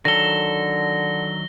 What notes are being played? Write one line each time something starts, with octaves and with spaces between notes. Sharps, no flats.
D3 D#3 F#3 A4 A#6 G7